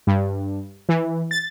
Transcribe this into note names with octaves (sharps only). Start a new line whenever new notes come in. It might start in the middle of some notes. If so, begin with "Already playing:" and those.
G2
E3
A6